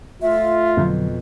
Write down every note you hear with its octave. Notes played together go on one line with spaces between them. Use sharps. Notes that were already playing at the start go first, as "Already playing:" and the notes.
A3 F4 E5
F2 B2 D3 F#3